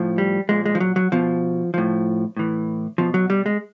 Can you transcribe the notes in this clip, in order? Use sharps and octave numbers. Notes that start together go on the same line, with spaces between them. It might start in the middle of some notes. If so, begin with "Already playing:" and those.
Already playing: A2 F3
G3
A#2 F3 G#3
G#3
F3
F#3
F#3
B2 F3
A2 F3
A2 E3
B2 F3
F#3
G3
G#3